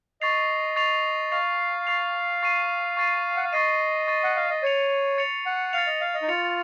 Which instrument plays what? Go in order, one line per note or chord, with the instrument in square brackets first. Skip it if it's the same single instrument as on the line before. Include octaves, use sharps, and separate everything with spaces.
[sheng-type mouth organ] D#5 [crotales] C#6 A6 C7 F7
[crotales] C#6 A6 C7 F7
[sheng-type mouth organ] F5 [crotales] C#6 A6 C7 F7
[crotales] C#6 A6 C7 F7
C#6 A6 C7 D#7
C#6 A6 C7 D#7
[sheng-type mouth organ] F#5
F5
[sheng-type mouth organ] D#5 [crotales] C#6 A6 C7 D#7
[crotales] C#6 A6 C7 D#7
[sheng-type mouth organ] F#5
F5
D#5
[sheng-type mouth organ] C#5 [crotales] A6 C#7 F7
[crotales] A6 C#7 F7
[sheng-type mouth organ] F#5
[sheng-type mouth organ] F5 [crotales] A6 C#7 F7
[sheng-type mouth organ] D#5
F5
D#5
D#4
[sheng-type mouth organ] F4 [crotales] A6 C#7 F7